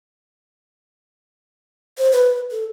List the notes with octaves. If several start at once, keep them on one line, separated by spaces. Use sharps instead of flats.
C5
B4
A4